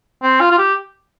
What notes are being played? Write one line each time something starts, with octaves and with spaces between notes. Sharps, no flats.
C4
F4
F4
G4